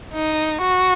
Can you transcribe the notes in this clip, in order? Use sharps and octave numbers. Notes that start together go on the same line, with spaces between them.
D#4
F#4